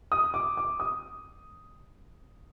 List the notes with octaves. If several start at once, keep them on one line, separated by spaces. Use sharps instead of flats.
D#6
D6
D6
D#6